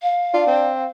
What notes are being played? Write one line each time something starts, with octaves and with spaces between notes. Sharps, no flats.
F5
D4 F4
C4